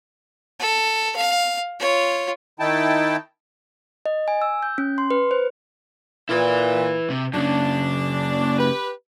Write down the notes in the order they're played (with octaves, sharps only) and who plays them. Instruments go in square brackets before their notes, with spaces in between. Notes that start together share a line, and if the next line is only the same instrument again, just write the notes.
[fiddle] A4
F5
F4 C#5
[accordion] D#3 D#4 E4 G5 A5
[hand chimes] D#5
G#5
E6
G6
C#4
C6
B4
C5
[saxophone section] A#2 [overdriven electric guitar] E4 B4
[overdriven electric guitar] C3
[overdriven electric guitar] F#2 C#3 [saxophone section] D4
[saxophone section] G4 B4